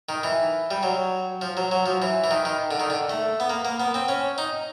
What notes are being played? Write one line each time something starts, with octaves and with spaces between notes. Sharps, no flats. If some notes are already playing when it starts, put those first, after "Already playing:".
D#3
E3
G3
F#3
F3
F#3
F#3
F3
E3
E3
D#3
D#3
D3
D#3
D3
A3
B3
A#3
A#3
B3
C4
C#4
D#4